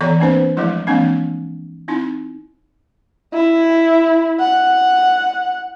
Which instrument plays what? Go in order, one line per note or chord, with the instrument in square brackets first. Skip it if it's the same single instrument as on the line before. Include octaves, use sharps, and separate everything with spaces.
[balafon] E3 B3 A4 C#5 D5 A#5
A#3 C4 D4 B4 C5
F3 F#3 G#3 A3 E4
E3 G#3 A#3 C4 D4
C4 D#4 E4
[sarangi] E4
F#5